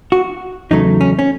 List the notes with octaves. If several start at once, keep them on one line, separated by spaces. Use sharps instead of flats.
F#4
E2 C#3 F#3 A3 D#4
C#4
C#4